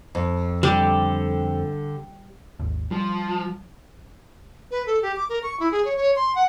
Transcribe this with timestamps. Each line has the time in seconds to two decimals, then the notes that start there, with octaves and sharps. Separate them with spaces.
0.15 F2
0.63 D3 G3 G4 A4
2.60 G#1 D#2
2.91 F3 G3
4.71 B4
4.86 A4
5.03 G4
5.16 D6
5.29 A#4
5.43 C#6
5.60 E4
5.72 G#4
5.85 C#5
5.97 C#5
6.16 C6
6.35 F#5